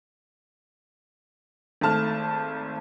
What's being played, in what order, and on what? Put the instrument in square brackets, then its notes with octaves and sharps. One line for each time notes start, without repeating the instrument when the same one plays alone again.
[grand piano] G#1 A3 A5 F6